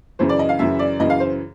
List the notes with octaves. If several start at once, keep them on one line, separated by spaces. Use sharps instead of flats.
F#2 C#3 E3 C5
D5
D#5
F5
F#2 C#3 E3 E5
D5
F#2 C#3 E3 D#5
F5
C5